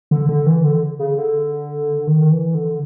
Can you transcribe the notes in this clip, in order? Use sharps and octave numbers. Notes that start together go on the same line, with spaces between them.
D3
D3
E3
D3
C#3
D3
D#3
E3
D3